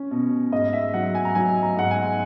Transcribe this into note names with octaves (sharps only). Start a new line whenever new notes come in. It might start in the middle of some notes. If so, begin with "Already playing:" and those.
Already playing: C#4
B2
G#2 D#5
E5
F#3 F#5
G#5
A#5
F#3 G#5
A#5
G#2 F#5
G#5